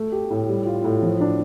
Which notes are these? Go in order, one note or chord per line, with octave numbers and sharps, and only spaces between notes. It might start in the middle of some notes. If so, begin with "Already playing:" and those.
Already playing: A3
G4
A2
G3
F4
A2
F3
D4